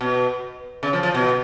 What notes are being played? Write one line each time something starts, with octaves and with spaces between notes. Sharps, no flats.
B2
C#3
F3
F3
B2